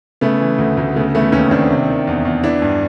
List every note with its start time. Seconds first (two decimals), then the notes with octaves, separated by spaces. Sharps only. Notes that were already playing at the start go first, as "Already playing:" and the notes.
0.21 C#3 A3 B3
0.40 E3
0.58 D2
0.77 D2
0.96 C#3 A3 B3
1.15 E3 A3 B3
1.32 D#2 B3 C#4
1.51 D#2 C4 D4
1.70 C3
1.89 D#3
2.07 E2
2.25 E2
2.43 E3 D4 E4
2.62 G2